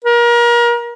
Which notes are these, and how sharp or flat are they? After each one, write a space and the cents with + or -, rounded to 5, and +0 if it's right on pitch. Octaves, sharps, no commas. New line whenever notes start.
A#4 +30